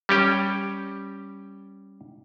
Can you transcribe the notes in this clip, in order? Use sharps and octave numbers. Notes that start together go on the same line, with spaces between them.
G3 C#4 G4